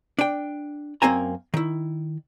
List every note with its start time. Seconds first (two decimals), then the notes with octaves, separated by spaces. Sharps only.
0.19 D4 G5
1.02 F#2 A#3 C4 G#5 A#5
1.54 D#3 E4